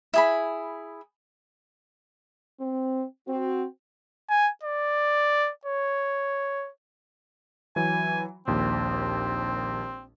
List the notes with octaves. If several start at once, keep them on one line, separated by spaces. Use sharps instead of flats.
E4 G#4 B5
C4
C4 F#4
G#5
D5
C#5
E3 F#3 G#5
A#1 D#2 C4